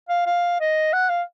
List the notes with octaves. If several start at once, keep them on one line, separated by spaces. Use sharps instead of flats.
F5
F5
D#5
F#5
F5